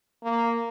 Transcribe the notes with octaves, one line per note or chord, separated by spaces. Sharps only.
A#3